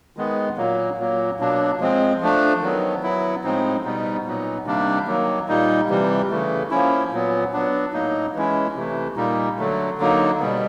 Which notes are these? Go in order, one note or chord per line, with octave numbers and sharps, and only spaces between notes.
D#3 G#3 B3
A#2 F#3 A#3
A#2 F#3 A#3
B2 F#3 A#3 D4
F3 G#3 C4
F3 A3 D4
D#3 F#3 B3
F#3 B3 E4
A2 F3 G#3 C4 D#4
B2 G3 B3 D#4
A#2 F#3 B3 D#4
C3 D#3 G3 A#3 D4
D#3 F#3 A#3
A#2 G3 A#3 D#4
C3 E3 G3
C#3 E3 A3
F3 A#3 C#4 E4
A#2 F#3 B3
F#3 B3 D4
A2 F#3 A#3 D#4
E3 G#3 C#4 E4
C3 E3 A3
A#2 G3 A#3 D#4
D3 F#3 A3
D3 F#3 A#3 D#4
B2 G3 B3